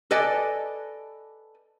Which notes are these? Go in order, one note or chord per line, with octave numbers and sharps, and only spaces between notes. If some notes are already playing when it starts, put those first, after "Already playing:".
A4 B4 D5 D#5 G#5